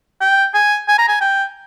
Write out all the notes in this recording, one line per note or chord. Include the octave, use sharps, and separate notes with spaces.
G5
G#5
G#5
A#5
G#5
G5